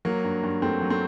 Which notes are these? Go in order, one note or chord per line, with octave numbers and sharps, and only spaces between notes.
F#3 A#3
G2
G2
G2 A3 C4
F#3
A3 C4